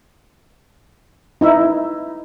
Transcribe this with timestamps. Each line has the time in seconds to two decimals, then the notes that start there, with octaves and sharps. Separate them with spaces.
1.41 D#4 E4 E5